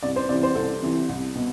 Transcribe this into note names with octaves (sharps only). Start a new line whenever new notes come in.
C2 D5
C5
C3 E3 D5
C5
C2 A4
C3 E3
C2
B2